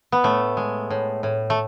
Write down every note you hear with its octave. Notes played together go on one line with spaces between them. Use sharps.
B3
A2 A3
G#3
A2
A2
A3